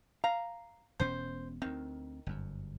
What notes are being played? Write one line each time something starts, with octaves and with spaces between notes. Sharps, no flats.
F5 A#5
E1 B2 C#4 C5
D2 D#3 C4
G1 F#2